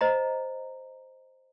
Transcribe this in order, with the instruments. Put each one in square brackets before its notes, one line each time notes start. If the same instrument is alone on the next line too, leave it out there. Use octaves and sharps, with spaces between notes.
[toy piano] C5 D#5 A#5